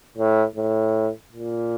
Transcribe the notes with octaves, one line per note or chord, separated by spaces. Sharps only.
A2
A2
A#2